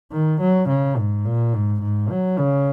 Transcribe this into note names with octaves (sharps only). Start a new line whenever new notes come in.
D#3
F#3
C#3
G#2
A#2
G#2
G#2
F#3
C#3